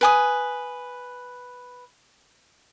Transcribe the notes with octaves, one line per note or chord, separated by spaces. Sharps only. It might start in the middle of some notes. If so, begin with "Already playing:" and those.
B4 G#5 D#6